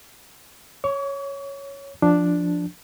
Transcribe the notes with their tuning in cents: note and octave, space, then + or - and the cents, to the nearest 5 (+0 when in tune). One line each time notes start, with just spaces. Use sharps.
C#5 +0 C#6 +45
F3 +0 D4 +0